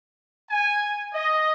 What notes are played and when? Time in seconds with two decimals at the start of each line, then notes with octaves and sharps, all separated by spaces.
0.50 G#5
1.14 D#5